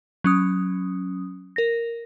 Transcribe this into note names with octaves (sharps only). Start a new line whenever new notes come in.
F#3 C#4 D#6
A#4 A#6